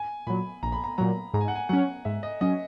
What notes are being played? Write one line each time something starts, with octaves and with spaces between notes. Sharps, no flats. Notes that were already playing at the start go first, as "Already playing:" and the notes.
Already playing: G#5
A#2 F#3 B5
A#1 A#5
B5
A#5
A#2 F#3 A#5
G#2 A#5
G#5
F#5
G#5
F#3 C#4 F#5
G#2 E5
D#5
F#3 C#4 D#5